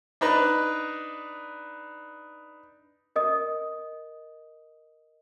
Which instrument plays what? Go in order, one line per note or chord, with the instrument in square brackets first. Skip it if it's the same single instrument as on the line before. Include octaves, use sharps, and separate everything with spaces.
[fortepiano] D4 D#4 B4
[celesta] A#4 D#5 D#6